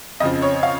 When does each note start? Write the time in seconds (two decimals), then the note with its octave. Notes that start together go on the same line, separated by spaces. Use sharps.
0.20 F2 D#5
0.23 C#3 F3
0.42 C#5
0.63 F5